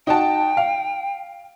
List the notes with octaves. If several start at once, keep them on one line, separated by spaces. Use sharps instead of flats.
D#4 F#4 G5 A5
F5